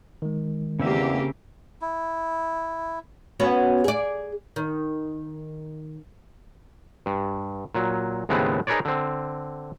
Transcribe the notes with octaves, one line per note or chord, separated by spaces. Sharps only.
D#3 G#3
E2 C#3 A#3 C4 G4 E5
E4
B3 C#4 F#4
G#4 D5
D#3
G2
A#2 F#3
D#2 A2 C#3 G#3 B3 C4
D#4 G#4 A#4 B4 C#5 D5
D3 C4